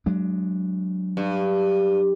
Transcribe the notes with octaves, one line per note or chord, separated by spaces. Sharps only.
F#3 G#3 D4
G2